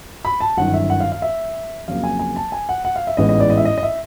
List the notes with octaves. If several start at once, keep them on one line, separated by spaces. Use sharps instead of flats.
B5
A5
G1 F#2 D#3 F#5
E5
F#5
F5
F5
E5
F2 C#3 F#3 A#3 F5
G#5
G#5
A5
G#5
F#5
F#5
F5
E5
A1 G#2 E3 G#3 B3 D#5
D#5
D5
D#5
E5
D#5
D#5
E5